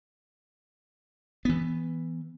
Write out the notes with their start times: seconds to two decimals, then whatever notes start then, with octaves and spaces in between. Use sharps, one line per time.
1.45 E3 B3